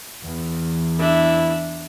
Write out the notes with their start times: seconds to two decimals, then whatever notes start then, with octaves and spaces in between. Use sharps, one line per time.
0.23 E2
0.99 D4 E4 E5